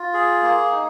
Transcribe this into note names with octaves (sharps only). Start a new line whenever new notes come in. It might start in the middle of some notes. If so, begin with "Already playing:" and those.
Already playing: F4
G#4
A#3
D#4